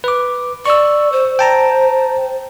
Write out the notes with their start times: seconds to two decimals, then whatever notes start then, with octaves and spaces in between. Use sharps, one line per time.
0.04 B4 D6
0.66 D5 C#6 E6
1.12 C5
1.39 G5 A5 A#5